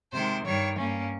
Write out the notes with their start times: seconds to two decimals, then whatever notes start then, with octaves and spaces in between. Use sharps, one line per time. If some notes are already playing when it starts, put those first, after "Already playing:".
0.13 C3 D#3 G#3 C5
0.45 G2 D#3 G3 C#5
0.77 G2 G3 A#3 C#4